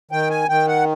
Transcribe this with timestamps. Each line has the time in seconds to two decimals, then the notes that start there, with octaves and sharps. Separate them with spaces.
0.11 D#3 G5
0.30 G#5
0.49 D#3 G5
0.67 F#5